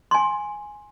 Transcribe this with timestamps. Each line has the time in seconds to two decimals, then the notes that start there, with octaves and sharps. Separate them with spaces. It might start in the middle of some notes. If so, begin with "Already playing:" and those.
0.11 G#5 C6